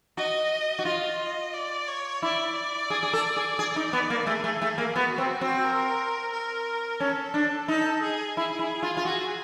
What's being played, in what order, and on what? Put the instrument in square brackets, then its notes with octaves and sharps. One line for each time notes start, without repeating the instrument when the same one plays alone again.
[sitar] F#4 [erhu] D#5
[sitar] F#4
[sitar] F4 [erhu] D#5
[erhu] D5
C#5
[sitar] E4 [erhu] D5
[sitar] G#4
G#4
A4
G#4
G#4
D#4
B3
A#3
[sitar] A3 [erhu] G#4
[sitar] A3
A3
A#3
[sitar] B3 [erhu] F#4
[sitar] C4
C4
[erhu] A#4
A#4
[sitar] C#4 [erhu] A4
[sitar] D4
[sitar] D#4 [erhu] A4
[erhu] G#4
[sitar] E4 [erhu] G#4
[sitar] E4
F4
F4
[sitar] F#4 [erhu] G#4